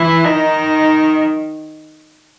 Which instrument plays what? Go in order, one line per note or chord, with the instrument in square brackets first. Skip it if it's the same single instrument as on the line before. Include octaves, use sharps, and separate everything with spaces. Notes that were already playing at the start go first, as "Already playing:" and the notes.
Already playing: [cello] E3 [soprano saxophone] E4
[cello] D#3 [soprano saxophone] D#4